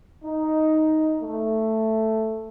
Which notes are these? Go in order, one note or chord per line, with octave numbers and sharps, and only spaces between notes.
D#4
A3